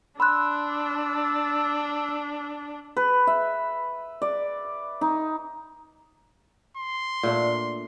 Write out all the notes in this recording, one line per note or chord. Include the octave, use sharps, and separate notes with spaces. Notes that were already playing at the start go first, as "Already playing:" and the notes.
D4 B5 C6 E6 F#6
B4
E5
D5
D#4
C6
A#2 A3 D4